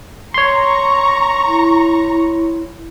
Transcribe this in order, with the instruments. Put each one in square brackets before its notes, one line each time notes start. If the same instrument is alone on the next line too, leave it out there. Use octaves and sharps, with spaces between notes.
[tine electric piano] C#5 C6 [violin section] A#5 C#6
[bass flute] E4